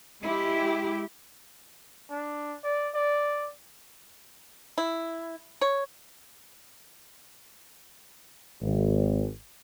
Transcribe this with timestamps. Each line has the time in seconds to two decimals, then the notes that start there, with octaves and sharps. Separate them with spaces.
0.22 G#3 E4 G4
2.11 D4
2.64 D5
2.95 D5
4.78 E4
5.61 C#5
8.62 G#1